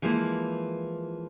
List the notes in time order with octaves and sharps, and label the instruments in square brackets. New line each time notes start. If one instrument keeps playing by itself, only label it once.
[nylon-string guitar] E3 F3 G#3 A#3 E4